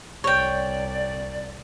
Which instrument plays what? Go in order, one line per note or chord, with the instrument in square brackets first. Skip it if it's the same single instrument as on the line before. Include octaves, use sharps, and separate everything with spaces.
[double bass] C2 [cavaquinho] C#5 G5 [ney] D5